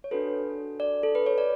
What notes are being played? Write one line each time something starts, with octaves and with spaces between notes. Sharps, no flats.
C#5
D4 F#4 A4 B4
D5
A4
B4
C#5
D5